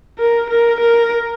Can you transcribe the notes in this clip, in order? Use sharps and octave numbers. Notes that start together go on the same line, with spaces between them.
A#4
A#4
A#4